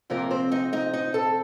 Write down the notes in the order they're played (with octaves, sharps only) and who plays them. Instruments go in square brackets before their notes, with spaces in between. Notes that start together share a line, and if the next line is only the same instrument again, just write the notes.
[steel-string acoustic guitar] F2 C3 F3 A#3 A#4
C4 C5
D#4 D#5
D#4 D#5
D#4 D#5
A4 A5